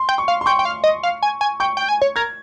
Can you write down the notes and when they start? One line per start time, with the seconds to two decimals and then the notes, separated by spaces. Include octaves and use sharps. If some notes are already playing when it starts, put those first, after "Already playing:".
Already playing: C6
0.09 G5
0.18 C#6
0.28 F5
0.41 C6
0.46 G5 C#6
0.59 G5
0.65 F5
0.84 D#5
1.03 F5
1.23 G#5
1.41 G#5
1.60 G5 C#6
1.77 G5
1.89 G#5
2.02 C#5
2.16 A#4 G#6